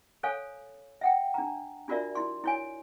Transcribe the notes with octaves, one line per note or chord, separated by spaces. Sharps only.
A4 C5 C#5 F5 G#5
E5 F#5 G5
D4 A#5
D4 F4 F#4 A#4 D5 E5
E4 C6
E4 C#5 G#5